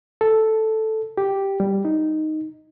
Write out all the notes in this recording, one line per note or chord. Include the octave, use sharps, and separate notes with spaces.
A4
G4
G3
D#4